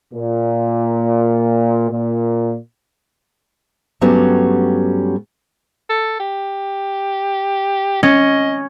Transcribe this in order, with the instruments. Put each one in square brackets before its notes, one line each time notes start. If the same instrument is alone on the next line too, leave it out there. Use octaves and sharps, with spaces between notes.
[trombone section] A#2
A#2
[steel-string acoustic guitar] G2 F#3 G3 A3 B3 C#4
[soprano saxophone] A4
G4
[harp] C#4 [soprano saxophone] D#5